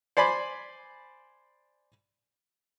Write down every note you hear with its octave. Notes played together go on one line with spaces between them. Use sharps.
C5 D5 G#5 B5